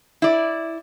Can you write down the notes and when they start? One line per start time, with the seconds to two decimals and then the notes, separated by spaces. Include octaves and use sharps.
0.22 E4 D5